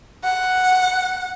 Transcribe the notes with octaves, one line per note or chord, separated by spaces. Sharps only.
F#5